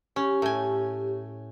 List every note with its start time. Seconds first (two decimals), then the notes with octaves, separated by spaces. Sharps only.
0.16 C#4 G4
0.42 A2 G#5